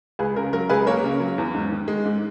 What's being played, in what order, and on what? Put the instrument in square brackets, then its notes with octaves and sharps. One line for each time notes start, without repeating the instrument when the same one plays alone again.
[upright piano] C#2 G#4 B4
C#3 A#4
F#3 A#4
C#2 G#4 B4
A#3 A#4 C#5
C#3
F#3
E2
G#2
D#3
G#3
G#2